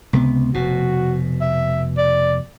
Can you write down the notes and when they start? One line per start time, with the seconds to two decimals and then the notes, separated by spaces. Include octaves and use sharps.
0.13 C#2 C3 B3
0.54 F1 B2 F#4
1.41 E5
1.98 D5